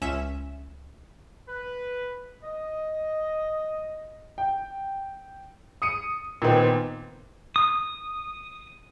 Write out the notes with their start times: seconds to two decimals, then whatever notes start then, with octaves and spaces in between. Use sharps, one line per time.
0.02 C#2 C#4 E5 E7
1.48 B4
2.42 D#5
4.38 G5
5.82 D#6 C#7 D#7
6.42 A#2 D#3 B3 C4
7.56 D#6